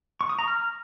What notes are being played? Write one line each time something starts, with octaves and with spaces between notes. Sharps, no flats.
C#6
D#6
A#5
F6